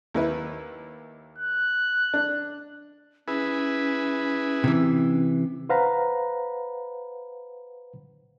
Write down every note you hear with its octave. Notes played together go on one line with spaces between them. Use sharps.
D#2 E4 B4
F#6
D4
C#4 E4 G#4 B4
C3 E3
B4 C5 F5 F#5 A#5 B5